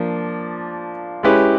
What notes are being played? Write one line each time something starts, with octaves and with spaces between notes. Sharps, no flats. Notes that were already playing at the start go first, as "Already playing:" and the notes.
Already playing: F3 A#3 D4
G#3 C#4 E4 G4 B4